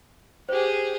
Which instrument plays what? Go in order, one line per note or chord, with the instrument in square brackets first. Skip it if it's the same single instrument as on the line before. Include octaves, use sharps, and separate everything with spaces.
[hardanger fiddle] G4 G#4 [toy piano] C5